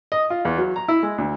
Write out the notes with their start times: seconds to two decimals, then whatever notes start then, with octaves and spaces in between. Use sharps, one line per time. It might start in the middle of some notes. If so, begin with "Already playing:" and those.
0.12 D#5
0.30 F4
0.45 E2
0.58 F#3
0.76 A#5
0.88 E4
1.03 G#3
1.18 D2